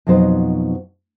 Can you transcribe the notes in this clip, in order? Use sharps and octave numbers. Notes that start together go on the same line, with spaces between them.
F2 B2 F#3 D#4 C5